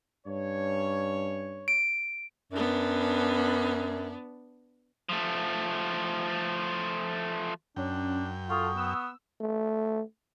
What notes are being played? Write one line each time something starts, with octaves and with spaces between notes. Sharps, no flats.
G2 C#4 C#5
D7
F#2 B3 D4
F3 A3
F#2 C#4 D4 G5
F4 A4 F#5 C#6 D#6
B3 E6
A3